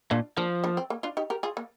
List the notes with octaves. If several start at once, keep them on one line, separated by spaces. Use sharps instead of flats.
A#2 D4 F4
F3 A#3 D4
A#3 D4
C4
A#3
D4 F4
D#4 G4
G4 A#4
F4 G#4
A#3